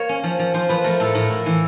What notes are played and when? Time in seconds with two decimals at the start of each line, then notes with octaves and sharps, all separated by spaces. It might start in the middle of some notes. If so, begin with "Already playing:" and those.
Already playing: A#3 C#5
0.09 C#4
0.24 F3
0.39 F3
0.54 F3 C5
0.69 F3 B4
0.84 A3 A#4
1.00 A2 A4
1.14 A2 A#4
1.31 A2
1.46 E3